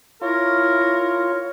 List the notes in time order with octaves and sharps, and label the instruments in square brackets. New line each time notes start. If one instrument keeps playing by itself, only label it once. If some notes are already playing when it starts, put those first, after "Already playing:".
[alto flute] E4 [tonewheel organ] F4 [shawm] A#4 [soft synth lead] C#5